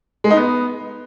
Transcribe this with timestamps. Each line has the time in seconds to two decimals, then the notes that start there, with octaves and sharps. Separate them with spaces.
0.24 G#3
0.30 D#4
0.37 B3